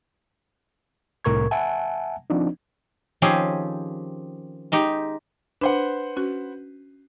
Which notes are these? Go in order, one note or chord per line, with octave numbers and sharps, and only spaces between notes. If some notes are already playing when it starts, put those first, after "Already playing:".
C2 A2 A#4 C#6 G#6
E5 F#5 G#5 A5
F3 C4 D4 D#4
D#3 F3 C4 C#4 G4 G#4
G#3 D#4 G4
D4 B4 C5 F#5
C#4 F#4